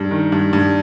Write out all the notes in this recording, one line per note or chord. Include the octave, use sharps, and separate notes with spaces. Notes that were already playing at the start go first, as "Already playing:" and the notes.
Already playing: G2
D#3
G2
G2